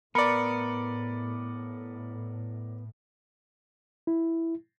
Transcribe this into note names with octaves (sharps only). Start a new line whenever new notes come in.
A2 B3 A#4 D5 B5 C#7
E4